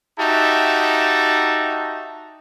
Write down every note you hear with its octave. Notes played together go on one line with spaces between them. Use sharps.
D#4 F#4 G4 E5 A5